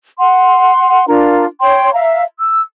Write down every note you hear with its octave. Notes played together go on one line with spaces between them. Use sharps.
F#5 C6
D4 F4 A#4 A#5
C#5 G5 C6
E5 F5 A#5
E6